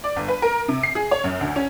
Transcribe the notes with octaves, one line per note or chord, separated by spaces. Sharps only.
D5
G1
B4
A#4
C3
C7
G#4
C#5
F#2
D2
C#4